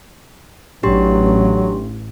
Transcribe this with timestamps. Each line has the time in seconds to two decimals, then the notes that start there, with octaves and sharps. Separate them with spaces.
0.83 A1 F#3 D4 G4 C6